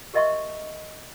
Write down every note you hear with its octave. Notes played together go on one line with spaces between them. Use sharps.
G4 A#4 D#5 E5 C6 C#6